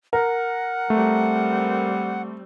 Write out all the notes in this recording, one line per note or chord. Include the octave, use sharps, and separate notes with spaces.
A#4 F#5
G3 A3 C4